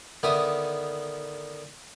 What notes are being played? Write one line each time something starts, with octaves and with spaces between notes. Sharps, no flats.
D3 D#3 B3 D#4 E5 D#6